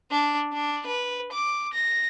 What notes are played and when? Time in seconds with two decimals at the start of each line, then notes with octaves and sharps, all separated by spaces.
0.11 D4
0.53 D4
0.86 B4
1.32 D6
1.73 A#6